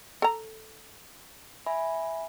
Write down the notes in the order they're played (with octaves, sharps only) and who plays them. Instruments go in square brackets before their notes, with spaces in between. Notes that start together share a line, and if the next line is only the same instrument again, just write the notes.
[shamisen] A4 A#5
[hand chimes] E5 G#5 B5